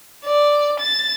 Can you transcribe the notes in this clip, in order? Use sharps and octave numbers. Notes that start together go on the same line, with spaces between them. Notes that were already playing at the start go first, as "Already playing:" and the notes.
D5
A6